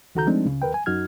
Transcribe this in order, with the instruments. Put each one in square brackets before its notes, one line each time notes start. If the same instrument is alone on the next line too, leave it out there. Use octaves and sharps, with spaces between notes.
[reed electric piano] C#2 D#3 F#4 A4 A#5 G6
F3 G#3 A3 C4 D4 D#4
C#2 C#3
D#2 A#4 B4 G5
G#5
F#2 D#4 F#4 F6 G#6